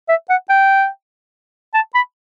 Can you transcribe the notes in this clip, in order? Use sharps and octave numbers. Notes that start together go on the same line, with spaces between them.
E5
F#5
G5
A5
B5